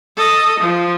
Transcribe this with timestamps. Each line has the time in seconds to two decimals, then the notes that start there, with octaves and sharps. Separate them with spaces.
0.17 A4 D#5
0.60 F3